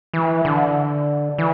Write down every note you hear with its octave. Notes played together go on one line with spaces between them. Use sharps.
E3
D3
E3